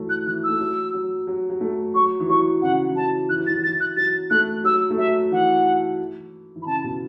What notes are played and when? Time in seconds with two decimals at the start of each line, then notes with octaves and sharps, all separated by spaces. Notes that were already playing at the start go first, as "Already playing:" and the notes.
Already playing: E3 F#3 A3
0.09 F#6
0.26 E3 F#6
0.43 E6
0.49 A3
0.60 F#3
0.93 F#3
1.27 F#3
1.50 F#3
1.61 A3
1.94 F#3 C#6
2.20 E3
2.29 F#3 C#6
2.61 C#3 F#5
2.90 E3
2.96 F#3 A5
3.29 E3 F#6
3.39 F#3
3.46 A6
3.49 E3
3.57 F#3
3.63 A6
3.67 E3
3.80 F#6
3.96 F#3 A6
4.30 A3 F#6
4.64 F#3 E6
4.90 A3
4.97 F#3 E5
5.31 E3 F#5
6.56 E3
6.62 B5
6.66 C#3 A5
6.84 B2